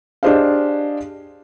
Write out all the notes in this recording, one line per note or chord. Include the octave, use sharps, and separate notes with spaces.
D4 G4 G#4 C5 D#5 F5